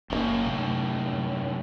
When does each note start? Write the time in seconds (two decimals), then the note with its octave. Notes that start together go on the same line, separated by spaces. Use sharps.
0.10 F#1 F#2 A2 C#3 A#3
0.47 C3 A3